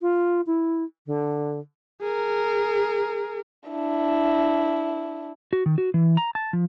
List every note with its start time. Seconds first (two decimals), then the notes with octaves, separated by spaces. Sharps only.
0.01 F4
0.46 E4
1.06 D3
2.02 G#4 A#4
3.69 D4 E4
5.53 F#4
5.66 D#3
5.78 F#4
5.94 E3
6.17 A#5
6.35 A5
6.53 F3